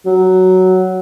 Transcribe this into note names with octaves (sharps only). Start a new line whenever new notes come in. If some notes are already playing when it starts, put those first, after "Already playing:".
F#3